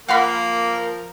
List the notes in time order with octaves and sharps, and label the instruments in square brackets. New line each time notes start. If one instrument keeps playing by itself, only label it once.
[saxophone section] F3 A#4 [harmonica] A#3 [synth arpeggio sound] F5 F#5 B5